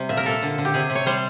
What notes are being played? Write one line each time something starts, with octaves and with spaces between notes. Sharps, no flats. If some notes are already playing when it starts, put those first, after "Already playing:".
Already playing: C3 G3
A#2 E5
A#4
A#2 A4
D3
D3
G4
C3 G#4
C3
C#5
G3 C5